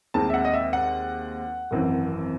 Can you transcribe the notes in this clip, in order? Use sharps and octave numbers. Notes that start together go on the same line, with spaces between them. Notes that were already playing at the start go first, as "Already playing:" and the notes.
D#2 D#3 G#3 C4 A5
E5
F#5
D#5
E5
F#5
G#1 F#2 E3 C4